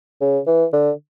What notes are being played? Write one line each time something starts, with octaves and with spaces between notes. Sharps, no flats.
C#3
E3
D3